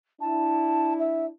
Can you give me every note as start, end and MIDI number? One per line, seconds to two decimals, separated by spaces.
0.21 1.29 62
0.21 1.29 64
0.21 0.93 81
0.99 1.25 76